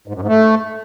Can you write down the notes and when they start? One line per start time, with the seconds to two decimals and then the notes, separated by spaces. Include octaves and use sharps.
0.08 G#2
0.14 F#2
0.21 G#2
0.28 A3